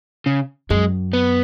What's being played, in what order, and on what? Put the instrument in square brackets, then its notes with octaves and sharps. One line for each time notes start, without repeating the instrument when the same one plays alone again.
[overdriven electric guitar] C#3
[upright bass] F#2 [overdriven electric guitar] G#3
[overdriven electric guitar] B3